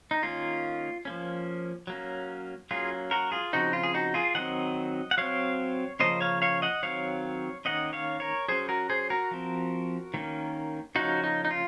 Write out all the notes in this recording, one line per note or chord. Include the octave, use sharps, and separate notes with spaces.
D#4
D#3 A#3 C#4 F4
F3 A#3 C#4
F#3 A#3 C#4
F#3 A#3 C#4 F4 G#4
F#4 A#4
F4 G#4
C#3 F3 C4 D#4 F#4
F4
G#4
D#4 F#4
F4 G#4
D#3 F#3 C4 D#5 F#5
F#5
F#3 C4 C#5 F5
C#3 F3 A#3 C#4 C5 D#5
C#5 F5
C#5 F5
D#5 F#5
D#3 F#3 C4 C#5 F5
D#3 A#3 C#4 D#5 F#5
C#5 F5
A#4 C#5
F#3 C#4 G#4 C5
F#4 A#4
G#4 C5
F#4 A#4
F3 C4
D#3 A#3 C#4
C#3 F3 A#3 C#4 D#4 F#4
D#4
D#4
F4